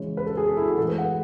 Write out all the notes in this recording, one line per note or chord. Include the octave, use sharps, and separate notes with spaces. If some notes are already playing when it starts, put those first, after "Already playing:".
Already playing: C#3 E3 G#3 C#5
B4
A4
G#4
A4
E4
F#4
A2 E3 G#3 A4
B4
F#5